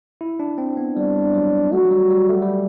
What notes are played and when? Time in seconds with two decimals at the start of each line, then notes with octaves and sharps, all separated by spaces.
0.21 E4
0.40 D4
0.58 C4
0.77 B3
0.96 G3 D4
1.34 F#3
1.72 A3 F#4
1.85 F#3
1.91 G3
2.10 G3
2.29 A3
2.42 G3